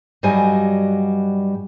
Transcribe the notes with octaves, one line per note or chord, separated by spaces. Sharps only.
G2 F#3 G3 F#4 D#5 G#5